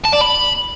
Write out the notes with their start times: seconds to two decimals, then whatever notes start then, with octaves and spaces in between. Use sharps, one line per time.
0.05 A5
0.13 D5
0.21 B5